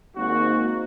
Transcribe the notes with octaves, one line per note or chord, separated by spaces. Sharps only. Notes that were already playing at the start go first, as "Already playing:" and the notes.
G#1 G#2 A#3 F#4